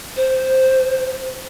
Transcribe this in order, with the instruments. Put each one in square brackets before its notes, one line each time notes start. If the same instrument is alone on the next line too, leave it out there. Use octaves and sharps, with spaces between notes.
[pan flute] C5